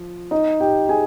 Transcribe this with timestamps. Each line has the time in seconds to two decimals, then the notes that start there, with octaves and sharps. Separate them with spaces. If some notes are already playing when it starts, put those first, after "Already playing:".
Already playing: F3
0.31 D#4 D#5
0.60 G4 G5
0.89 G#4 G#5